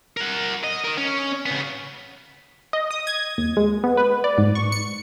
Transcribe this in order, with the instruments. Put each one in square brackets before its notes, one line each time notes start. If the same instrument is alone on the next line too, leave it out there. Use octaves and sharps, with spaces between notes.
[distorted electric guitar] A#4 F#5
D#5
A#4 D#5
C#4
C#3 B3
[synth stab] D#5
D#6
G#6
D#2
G#3
B3
B4
D5
G#2
C#6
C#7